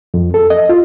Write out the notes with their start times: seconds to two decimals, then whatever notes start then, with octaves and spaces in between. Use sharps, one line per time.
0.14 F2
0.34 A4
0.50 D#5
0.69 F4